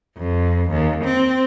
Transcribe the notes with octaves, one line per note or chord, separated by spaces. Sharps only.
F2
D#2
C4